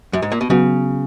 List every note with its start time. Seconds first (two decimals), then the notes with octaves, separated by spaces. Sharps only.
0.13 F#2
0.22 G#2
0.32 A#2
0.41 B2
0.50 C#3 F#3 B3 F#4